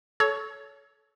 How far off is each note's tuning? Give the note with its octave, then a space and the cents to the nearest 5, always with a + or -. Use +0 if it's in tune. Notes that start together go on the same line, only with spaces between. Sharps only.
A4 -20 C#5 +15